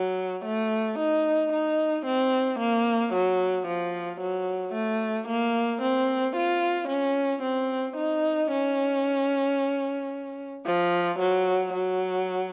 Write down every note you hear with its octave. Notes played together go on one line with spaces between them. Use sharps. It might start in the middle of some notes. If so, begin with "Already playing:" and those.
Already playing: F#3
A3
D#4
D#4
C4
A#3
F#3
F3
F#3
A3
A#3
C4
F4
C#4
C4
D#4
C#4
F3
F#3
F#3